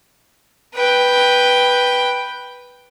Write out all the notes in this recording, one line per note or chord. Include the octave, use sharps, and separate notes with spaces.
B4 G5